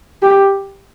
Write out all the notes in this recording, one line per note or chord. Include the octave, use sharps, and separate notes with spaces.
G4